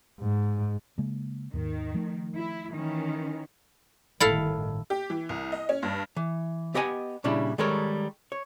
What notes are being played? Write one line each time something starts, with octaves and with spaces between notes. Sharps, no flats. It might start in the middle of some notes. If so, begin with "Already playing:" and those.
G#2
C#3 G#3 A#3
D#2 G#2 D#3
F3 A3
E4
D#3 E3 C#4
G1 A2 D#3 E4 A4 F5
G4
E3
C2
D#5
C#4
G2
E3
B3 G4 D#5 F#5 G#5
A#2 C#3 G3 D4 E4
D#3 G3 G#3 A4 A#4 C#5
C#5